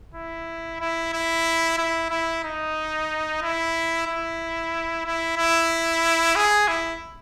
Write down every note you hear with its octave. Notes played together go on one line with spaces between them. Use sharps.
E4
E4
E4
E4
E4
D#4
E4
E4
E4
E4
G#4
E4